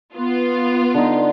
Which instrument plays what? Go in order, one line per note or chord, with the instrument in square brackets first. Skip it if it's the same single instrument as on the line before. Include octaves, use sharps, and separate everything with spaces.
[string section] B3 F4
[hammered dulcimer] D3 D#4